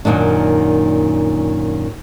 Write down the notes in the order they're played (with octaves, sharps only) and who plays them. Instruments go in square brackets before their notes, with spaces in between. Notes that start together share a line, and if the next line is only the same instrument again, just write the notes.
[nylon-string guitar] F#2 A#2 D#3 D4